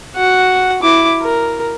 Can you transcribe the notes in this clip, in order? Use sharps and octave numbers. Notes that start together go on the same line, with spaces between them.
F#4 F#5
E4 D6
A#4